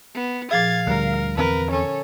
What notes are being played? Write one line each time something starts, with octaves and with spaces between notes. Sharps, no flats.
B3
A#2 F3 G#4 F5 G#6 A6
D2 D3 G3 A#4 A#5
E2 C4 A#4 B4
C#4 A4